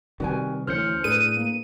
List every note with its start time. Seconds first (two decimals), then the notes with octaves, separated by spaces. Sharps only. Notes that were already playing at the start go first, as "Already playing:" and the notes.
0.20 C3 D#3 G3 F#4 B4 G#5
0.67 D2 E3 C#4 C5 F6 G6 C#7
1.04 A2 D4 G#4 B4 D#7
1.37 A#3